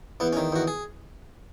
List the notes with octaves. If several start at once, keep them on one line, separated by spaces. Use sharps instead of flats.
E2 B3
C#4
D#3
E2 F#4
G#4